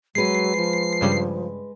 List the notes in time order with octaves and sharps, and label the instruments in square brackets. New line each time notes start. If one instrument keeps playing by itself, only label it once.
[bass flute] F#3 [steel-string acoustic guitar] G#3 B4 [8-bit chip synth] C7
[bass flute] F3
[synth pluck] G2 C#3 G3